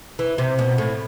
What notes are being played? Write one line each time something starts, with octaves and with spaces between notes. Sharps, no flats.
E3
C3
B2
A2